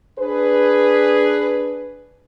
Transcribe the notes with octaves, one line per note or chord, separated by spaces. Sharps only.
D4 G#4 B4